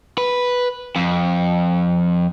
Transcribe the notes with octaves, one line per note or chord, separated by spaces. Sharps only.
B4
F2